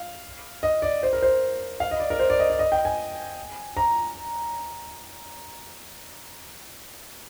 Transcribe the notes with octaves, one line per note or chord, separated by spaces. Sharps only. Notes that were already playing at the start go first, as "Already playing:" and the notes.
Already playing: F5
D#5
D5
C5
A#4
C5
F5
D#5
D5
A#4
C5
D5
D#5
D5
D#5
G5
G#5
A#5